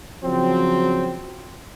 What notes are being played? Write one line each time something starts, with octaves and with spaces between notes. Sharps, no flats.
C#3 F3 F#3 C4